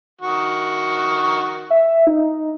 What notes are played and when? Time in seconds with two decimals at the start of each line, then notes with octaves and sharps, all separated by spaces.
0.21 D#3 F#4
1.70 E5
2.07 D#4